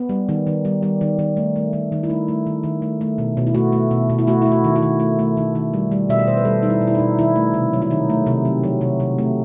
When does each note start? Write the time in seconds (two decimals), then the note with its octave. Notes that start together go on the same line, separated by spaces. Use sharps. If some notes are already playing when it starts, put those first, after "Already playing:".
Already playing: B3
0.09 G3
0.29 D#3
0.47 D#3
0.65 G3
0.82 G3
1.01 D#3
1.19 D#3
1.37 A3
1.56 A3
1.73 D#3
1.92 D#3
2.03 E4
2.10 A3 D#4
2.28 A3
2.46 D#3
2.64 D#3
2.82 A3
3.01 A3
3.18 B2
3.37 B2
3.47 E4
3.55 A3 F#4
3.73 A3
3.91 B2
4.09 B2
4.19 E4
4.27 A3 F#4
4.42 A3 E4
4.52 F#4
4.64 D#3
4.76 E4
4.82 D#3
5.00 A3
5.19 A3
5.37 D#3
5.55 D#3
5.74 G3
5.92 G3
6.09 B2 E5
6.19 D#5
6.27 B2 C5
6.37 B4
6.45 G3 A4
6.63 G3 D#4
6.70 E4
6.81 B2
6.88 E4
6.95 B2 D#4
7.18 D#3 E4
7.36 A3
7.54 C3
7.73 F#3
7.82 E4
7.91 D#3 D#4
8.10 A3
8.27 C3
8.45 F#3
8.64 F#3
8.81 C3
9.00 C3
9.18 A3